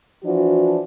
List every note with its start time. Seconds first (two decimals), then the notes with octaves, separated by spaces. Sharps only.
0.23 E3 F3 D4 F#4